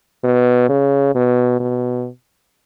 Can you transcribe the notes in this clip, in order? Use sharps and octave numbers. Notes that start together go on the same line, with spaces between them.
B2
C#3
B2
B2